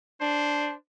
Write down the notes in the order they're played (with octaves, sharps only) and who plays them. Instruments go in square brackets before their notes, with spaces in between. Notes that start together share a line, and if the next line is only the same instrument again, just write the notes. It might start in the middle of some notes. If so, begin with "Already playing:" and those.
[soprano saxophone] D4 [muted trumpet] C5